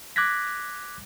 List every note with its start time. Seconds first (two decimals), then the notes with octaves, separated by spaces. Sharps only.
0.16 D6 F#6 G#6 A#6 B6